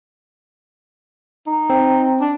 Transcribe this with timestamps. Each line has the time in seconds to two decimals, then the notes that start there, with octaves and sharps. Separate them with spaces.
1.47 D#4
1.70 C4
2.21 D4